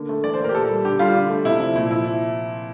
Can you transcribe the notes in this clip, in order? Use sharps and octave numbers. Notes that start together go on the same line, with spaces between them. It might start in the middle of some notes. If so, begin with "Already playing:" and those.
Already playing: D3 A#3
A3
E3 D5
C5
A#3 A#4
G4
A#2 A4
G3
D3 G4
G3 F4
D3
A3
C3 E4
F3
A#2 E4
F3 E4